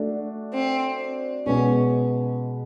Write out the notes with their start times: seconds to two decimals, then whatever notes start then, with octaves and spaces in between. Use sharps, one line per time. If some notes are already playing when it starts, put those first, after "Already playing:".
Already playing: A3 D4 F#4 A4
0.54 C4
1.46 B2 G#3 B3 C#4